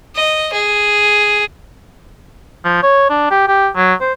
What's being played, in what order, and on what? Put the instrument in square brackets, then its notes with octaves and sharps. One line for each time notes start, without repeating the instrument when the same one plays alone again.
[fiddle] D#5
G#4
[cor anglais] F3
C#5
D4
G4
G4
F#3
C5